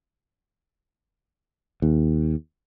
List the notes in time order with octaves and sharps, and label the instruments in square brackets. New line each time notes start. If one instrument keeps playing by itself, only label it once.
[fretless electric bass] D#2